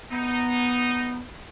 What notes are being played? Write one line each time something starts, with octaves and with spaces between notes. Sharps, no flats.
B3 D#4